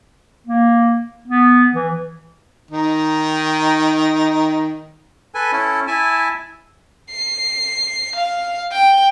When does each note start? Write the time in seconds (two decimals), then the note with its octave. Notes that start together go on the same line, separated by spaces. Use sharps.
0.47 A#3
1.28 B3
1.73 E3
2.71 D#3 D#4
5.35 A4 B4 G#5
5.52 C#4 E4 A4
5.87 E4 E5 G#5 A5
7.11 C7
8.16 F5
8.72 G5